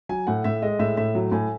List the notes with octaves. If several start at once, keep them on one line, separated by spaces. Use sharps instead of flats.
F#3 G#5
A2 F#5
A2 E5
G#3 D#5
A2 E5
A2 E5
F#3
A2 G#5